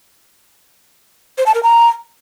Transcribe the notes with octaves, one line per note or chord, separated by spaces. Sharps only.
C5
A5
A#4
A#5